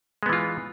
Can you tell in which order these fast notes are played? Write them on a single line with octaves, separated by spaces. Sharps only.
G#3 B3 E3 F4